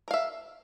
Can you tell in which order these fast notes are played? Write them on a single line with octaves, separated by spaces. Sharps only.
A#4 F5 E5